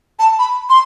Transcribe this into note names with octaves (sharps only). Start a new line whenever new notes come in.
A5
B5
C6